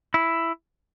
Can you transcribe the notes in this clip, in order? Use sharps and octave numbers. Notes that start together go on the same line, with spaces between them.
E4